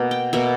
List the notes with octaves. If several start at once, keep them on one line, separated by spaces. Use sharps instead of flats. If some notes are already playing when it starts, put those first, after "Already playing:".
Already playing: B2 A#3
G5
B2 A#3 E5